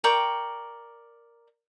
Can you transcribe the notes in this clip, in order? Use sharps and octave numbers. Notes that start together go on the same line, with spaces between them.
A#4 D5 G5 C#6